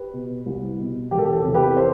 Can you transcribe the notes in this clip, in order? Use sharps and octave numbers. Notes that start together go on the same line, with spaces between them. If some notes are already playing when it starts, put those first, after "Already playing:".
Already playing: G4 B4
B2
C2
B2
E1 G4
A4
G4
A4
C3
E2
G4 B4
A4 C5